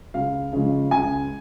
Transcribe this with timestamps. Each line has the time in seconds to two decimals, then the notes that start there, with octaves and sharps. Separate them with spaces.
0.14 C#2 F5
0.53 C#3 F3 G#3
0.91 C#2 G#5